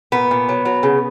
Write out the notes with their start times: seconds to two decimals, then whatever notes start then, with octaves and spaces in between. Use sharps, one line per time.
0.12 A#2 B3
0.31 A#2
0.49 F#3
0.65 F#3
0.83 C#3